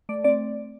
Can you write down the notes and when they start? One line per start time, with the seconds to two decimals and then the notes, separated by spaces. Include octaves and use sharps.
0.09 A3 D5
0.24 C4 D5